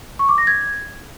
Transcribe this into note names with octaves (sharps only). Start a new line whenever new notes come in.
C#6
D6
A#6
G#6